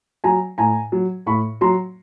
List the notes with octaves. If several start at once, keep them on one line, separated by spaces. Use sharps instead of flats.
F#3 G#5 A#5
A2 G#5 A#5
F#3
A2 B5 C#6
F#3 A#5 C6